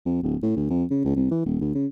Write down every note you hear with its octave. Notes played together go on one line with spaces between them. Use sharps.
F2
D1
A2
D2
F2
C#3
C#2
C2
E3
D#1
D2
C#3